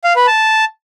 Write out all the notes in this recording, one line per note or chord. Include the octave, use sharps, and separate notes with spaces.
F5
B4
A5